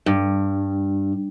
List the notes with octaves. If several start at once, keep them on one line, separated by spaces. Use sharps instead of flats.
G2